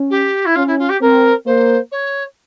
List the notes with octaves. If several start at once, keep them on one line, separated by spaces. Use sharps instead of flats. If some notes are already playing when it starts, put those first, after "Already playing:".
Already playing: C#4
G4
E4
C#4 F4
E4
F4
G4
C4 A#4
A#3 C5
C#5